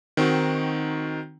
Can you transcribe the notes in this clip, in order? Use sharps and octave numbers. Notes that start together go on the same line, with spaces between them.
D#3 C4 D#4 F#4